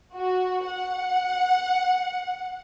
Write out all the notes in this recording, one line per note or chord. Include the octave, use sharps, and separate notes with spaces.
F#4
F#5